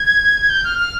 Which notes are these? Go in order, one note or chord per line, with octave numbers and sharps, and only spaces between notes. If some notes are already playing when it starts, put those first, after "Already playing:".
Already playing: G#6
G6
F6
F6